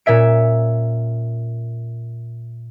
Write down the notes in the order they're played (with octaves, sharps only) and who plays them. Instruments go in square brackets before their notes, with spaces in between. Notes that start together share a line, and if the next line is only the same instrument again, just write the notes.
[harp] A#2 C#4 E5 D7